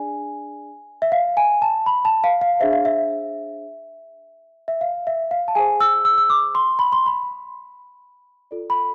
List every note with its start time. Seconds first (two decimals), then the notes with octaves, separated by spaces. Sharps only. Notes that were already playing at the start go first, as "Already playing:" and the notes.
Already playing: D4 G#4 D5 G#5
1.02 E5
1.12 F5
1.37 G#5
1.62 A5
1.86 B5
2.05 A5
2.24 F5
2.41 F5
2.60 D4 G#4 C5 E5
2.73 F5
2.85 E5
4.68 E5
4.81 F5
5.07 E5
5.31 F5
5.48 A5
5.55 G#4 C5 G#5
5.80 E6
6.05 E6
6.18 E6
6.30 D6
6.55 C6
6.79 B5
6.92 C6
7.06 B5
8.51 F4 A4 D5
8.70 B5